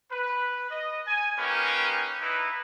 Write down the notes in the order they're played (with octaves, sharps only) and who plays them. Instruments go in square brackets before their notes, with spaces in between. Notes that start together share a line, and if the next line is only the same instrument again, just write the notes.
[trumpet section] B4
D#5
G#5
A#3 C#4 D#4 G4 B4
D#4 E4 B4